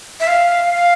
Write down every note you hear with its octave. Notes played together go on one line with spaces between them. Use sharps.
E5
F5
F5